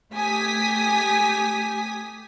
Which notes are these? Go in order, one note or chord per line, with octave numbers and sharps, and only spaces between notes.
A3 G4 G#5 D#6 B6